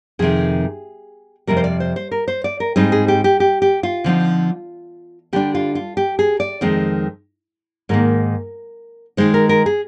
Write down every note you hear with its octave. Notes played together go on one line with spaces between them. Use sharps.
F2 C3 D#3 G#4
F2 C3 G3 A#4
C5
D5
C5
C5
A#4
C5
D5
A#4
G#2 G3 C4 D#4 G#4
G#4
G4
G4
G4
G4
F4
D3 F3 C4 D#4
D3 G3 D4 G4
F4
F4
G4
G#4
D5
F2 D#3 G#3 C4
G#2 D#3 A#3 A#4
D#3 G#3 D#4 C5
A#4
A#4
G#4